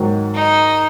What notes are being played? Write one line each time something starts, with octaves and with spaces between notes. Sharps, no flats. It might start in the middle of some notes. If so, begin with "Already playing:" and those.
Already playing: G#2 D#3 F#3
D#4